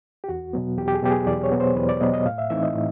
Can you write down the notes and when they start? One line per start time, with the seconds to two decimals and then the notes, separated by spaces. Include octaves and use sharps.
0.24 G4
0.28 E2 F#4
0.53 B2 F#3 B3
0.78 E2 G4
0.88 G4
0.95 G#4
1.02 B2 F#3 B3 G4
1.11 G#4
1.27 E2 D5
1.44 C#5
1.52 B2 F#3 B3
1.60 C5
1.76 E2 B4
1.89 D5
2.01 B2 F#3 B3 D#5
2.14 D#5
2.25 A2 F5
2.38 E5
2.50 E3 A3 C4 D#4 E5
2.63 D#5
2.75 A2